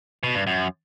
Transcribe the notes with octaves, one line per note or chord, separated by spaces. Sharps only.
B2
G2
F#2